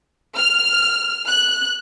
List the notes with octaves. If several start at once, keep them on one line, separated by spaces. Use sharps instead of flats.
F6
F#6